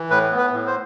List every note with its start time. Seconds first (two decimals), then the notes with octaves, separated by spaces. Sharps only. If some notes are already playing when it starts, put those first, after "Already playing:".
Already playing: E3
0.10 A2 B4
0.31 B3
0.38 B4
0.53 A2
0.67 C5